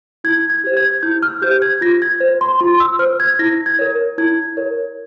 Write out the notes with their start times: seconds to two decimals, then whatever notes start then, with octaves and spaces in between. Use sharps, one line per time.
0.24 E4 G#6
0.50 G#6
0.64 G4 C5
0.77 G#6
1.03 E4 G6
1.23 F6
1.42 G4 C5 G6
1.62 G#6
1.81 F4 A#6
2.02 G#6
2.20 C5
2.41 C6
2.60 F4 C6
2.80 E6
2.99 C5 F6
3.20 G#6
3.39 E4 A#6
3.66 G#6
3.79 A#4 C#5
4.18 E4 G#6
4.57 A#4 C#5